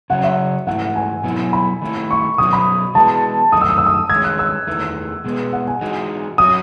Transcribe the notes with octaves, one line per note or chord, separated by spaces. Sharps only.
C#3 F#3 C#4 F#5
E5
G#2 E3 A3 E4 F#5
G#5
B2 F#3 B3 E4
B5
D#3 A3 E4
C#6
B2 F#3 C#4 F#4 D#6
B5
E3 G#3 B3 A5
F#2 D#3 A3 D#4 D#6
E6
D#6
E6
D#6
D#3 G#3 C#4 G#6
F#6
E6
E2 D#3 A3 E4
B2 G#3 B3
F#5
G#5
E3 G#3 D#4 F#4
F#3 C#4 F#4 D#6